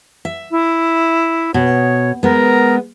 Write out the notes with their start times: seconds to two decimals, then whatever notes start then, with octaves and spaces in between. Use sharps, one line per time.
0.25 E5
0.51 E4
1.54 B2 C#5
2.23 G#3 B3 A#4